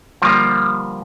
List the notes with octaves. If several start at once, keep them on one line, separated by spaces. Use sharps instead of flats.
D3 F3 G3 A#3